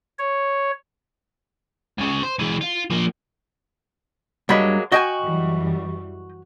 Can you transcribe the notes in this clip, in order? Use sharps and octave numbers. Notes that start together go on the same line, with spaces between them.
C#5
C#2 C#3
C5
E3 G#3
F4
F3 A#3
G2 F#3 G#3 A#3 B5
F#4 D#5 G5 G#5
F#2 E3 G3